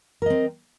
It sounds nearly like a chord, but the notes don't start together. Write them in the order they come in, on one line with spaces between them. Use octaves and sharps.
A#4 D#5 C4